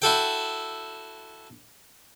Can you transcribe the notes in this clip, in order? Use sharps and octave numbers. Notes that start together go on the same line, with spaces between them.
E4 F#4 A4 G5